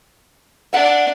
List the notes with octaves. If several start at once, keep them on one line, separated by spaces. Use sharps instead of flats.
D4 E5 F#5